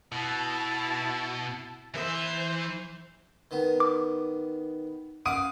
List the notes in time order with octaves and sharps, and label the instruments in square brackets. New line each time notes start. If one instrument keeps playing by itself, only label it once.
[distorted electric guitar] B2 [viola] E4 A5
[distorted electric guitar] E3 E5 [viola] C5
[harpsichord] D#3 B3 [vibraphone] D#4
[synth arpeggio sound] D6
[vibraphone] C#4 [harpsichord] F5 F#5 [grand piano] D#6 D7 D#7